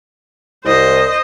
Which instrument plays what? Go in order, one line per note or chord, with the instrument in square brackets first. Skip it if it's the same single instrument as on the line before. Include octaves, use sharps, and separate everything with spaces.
[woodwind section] C2 [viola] C5 D#5